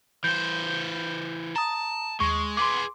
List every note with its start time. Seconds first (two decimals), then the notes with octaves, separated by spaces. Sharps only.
0.24 E3 C5 G6
1.56 A5 A#5 D#6
2.20 D#2 G#3 C#6
2.57 G#4 B4 C6 D6